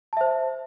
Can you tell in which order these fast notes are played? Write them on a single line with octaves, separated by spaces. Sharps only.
A5 E5 C5